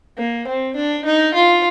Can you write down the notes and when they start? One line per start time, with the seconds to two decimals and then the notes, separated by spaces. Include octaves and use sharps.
0.18 A#3
0.47 C4
0.76 D4
1.05 D#4
1.34 F4